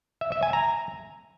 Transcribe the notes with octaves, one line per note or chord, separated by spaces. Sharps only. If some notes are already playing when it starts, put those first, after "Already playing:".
E5
E5
G#5
A#5